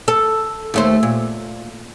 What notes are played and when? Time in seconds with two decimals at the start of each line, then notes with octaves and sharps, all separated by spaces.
0.08 A4
0.74 D#2 A3 C5
1.03 A#2